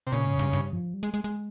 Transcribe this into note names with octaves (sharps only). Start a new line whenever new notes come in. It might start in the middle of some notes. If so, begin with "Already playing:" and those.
C3
A#2 C#3
G#2
F2
G2
G2
F3
G3
G#3
G#3
G#3